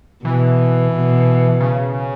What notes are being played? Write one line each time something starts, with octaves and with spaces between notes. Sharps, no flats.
B2 E3
B2
C#3